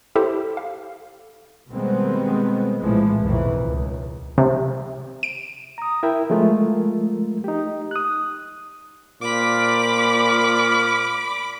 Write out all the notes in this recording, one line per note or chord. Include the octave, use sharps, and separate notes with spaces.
E4 G4 A4 C5
F5
B2 D#3 G3 G#3 B3 C4
A#1 A2 E3 F3 G#3
B1 F2 D#3 E3
C#2
C3
D7
A#5 D#6
E4 A#4 E5 G5
F3 G#3 A3 F4 A#4
D#4 G4
D#6 F#6
A#2 C5 D5 F5 B5 D6